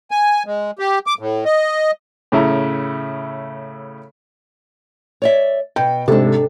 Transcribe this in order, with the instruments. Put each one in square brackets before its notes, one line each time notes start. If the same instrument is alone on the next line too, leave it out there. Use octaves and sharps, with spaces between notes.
[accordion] G#5
G#3
G4
D6
A2
D#5
[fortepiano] A2 C#3 E4 A#5
[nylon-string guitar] C#5 D5 E5
[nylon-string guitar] B2 [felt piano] G5
[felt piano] G#2 C3 [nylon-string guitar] D4 A4